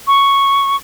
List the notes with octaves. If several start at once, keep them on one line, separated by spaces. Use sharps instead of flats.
C#6